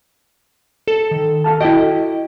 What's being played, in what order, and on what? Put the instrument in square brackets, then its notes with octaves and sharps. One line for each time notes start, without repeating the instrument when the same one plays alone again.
[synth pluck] A4
[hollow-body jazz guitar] D#3
A4 F5 A5
[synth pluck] E4 D#5 [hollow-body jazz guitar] F#4 A4 G5